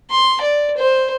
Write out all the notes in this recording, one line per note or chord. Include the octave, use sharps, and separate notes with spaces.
C6
D5
C5